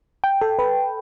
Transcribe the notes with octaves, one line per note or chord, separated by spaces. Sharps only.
G5
A4
B4